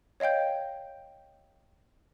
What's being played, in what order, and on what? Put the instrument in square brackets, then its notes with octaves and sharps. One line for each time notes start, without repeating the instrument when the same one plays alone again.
[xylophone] C#5 D#5 F5 G5 G6